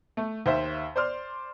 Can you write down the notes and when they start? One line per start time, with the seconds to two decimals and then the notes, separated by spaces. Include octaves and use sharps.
0.17 A3
0.46 D#2 C5 E5
0.96 C5 D5 C6 F6